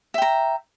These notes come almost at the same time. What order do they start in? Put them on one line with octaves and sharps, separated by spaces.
E5 G5 A#5